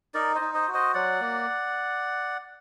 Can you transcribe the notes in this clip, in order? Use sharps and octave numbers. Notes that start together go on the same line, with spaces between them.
D#4 A#4 D5
C5 D#5
D#4
C5 D#5
F#4
C5 D#5
F#3 D5 F#5
A#3